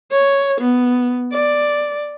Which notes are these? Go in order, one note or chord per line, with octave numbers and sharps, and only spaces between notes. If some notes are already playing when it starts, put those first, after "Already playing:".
C#5
B3
D5